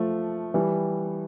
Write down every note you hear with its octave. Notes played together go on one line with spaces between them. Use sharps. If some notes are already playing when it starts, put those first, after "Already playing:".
Already playing: F3 A3
E3 G3